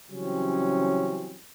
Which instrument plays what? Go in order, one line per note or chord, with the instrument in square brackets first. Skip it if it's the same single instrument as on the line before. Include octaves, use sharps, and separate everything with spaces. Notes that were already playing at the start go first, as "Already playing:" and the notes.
[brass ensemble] C#3 E3 F#3 G3 C4 C#4